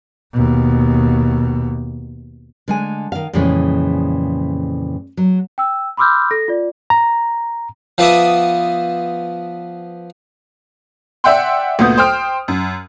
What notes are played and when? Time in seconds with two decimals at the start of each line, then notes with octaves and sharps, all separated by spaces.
0.33 D#2 B2
2.68 D3 G#3 G#5
3.12 D#3 F5
3.33 F2 A#2 C#3 E3 G#3
5.17 F#3
5.58 G5 E6
5.97 B5 C6 D6 E6 F6 G6
6.31 A4 A#6
6.48 F4 D5
6.90 A#5
7.98 F3 B3 D5 E5 D#6
11.24 D5 E5 F#5 G5 C6
11.79 D2 A#2 B3 D#6 G6
11.97 C5 G5 F6 D7
12.48 F#2